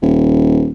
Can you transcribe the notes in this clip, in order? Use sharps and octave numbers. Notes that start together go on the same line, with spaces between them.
D#1